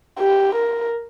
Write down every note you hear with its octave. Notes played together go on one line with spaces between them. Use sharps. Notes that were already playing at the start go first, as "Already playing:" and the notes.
G4
A#4